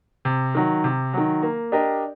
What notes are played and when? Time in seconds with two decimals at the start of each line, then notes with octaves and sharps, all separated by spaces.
0.25 C3
0.55 D#3 F#3
0.84 C3
1.13 D#3 F#3
1.42 A#3
1.72 D4 G4 A#4 D#5